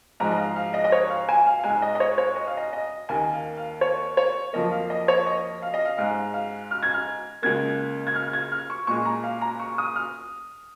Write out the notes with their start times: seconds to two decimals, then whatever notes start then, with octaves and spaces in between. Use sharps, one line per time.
0.20 G#2 F3 G#3 A#5
0.32 D#5
0.38 F5
0.56 F5
0.74 D#5
0.84 D#5
0.92 C#5
1.10 F5
1.29 G#5
1.46 F5
1.60 F5
1.64 G#2 G#3 G#5
1.82 D#5
1.95 D#5
2.00 C#5
2.18 C#5
2.36 D#5
2.47 F5
2.57 D#5
2.73 D#5
3.09 D#2 D#3 A#3 G#5
3.33 F5
3.57 F5
3.81 C#5
4.17 C#5
4.53 F2 F3 A#3 D#5
4.71 F5
4.90 D#5
5.08 C#5
5.26 D#5
5.62 F5
5.74 D#5
5.85 F5
5.97 G#2 G#3 F5
6.34 F5
6.71 F6
6.83 G#6
6.94 F6
7.42 C#2 C#3 A#3 G#6
8.07 G#6
8.15 F6
8.27 F6
8.33 G#6
8.52 F6
8.70 C#6
8.87 A#2 G#3 C#6
9.05 A#5
9.24 F5
9.41 A#5
9.60 C#6
9.78 D#6
9.96 F6